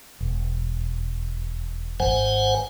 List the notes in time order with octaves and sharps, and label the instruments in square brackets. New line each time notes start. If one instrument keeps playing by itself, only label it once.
[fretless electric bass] E1
[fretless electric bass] D#1 G#1 [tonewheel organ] C5 F#5 G#5